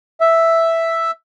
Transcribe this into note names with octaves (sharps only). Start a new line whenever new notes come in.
E5